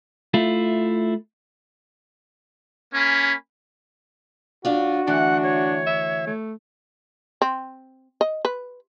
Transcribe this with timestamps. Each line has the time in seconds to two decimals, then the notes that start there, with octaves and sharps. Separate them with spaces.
0.34 A3 E4 F4
2.94 A#3 C#4 G#5 B5
4.65 F#2 D4 F4 F#4
5.07 D2 E3 D4 F#5
5.43 C#5
5.87 E5
6.27 A3
7.42 C4
8.21 D#5
8.45 B4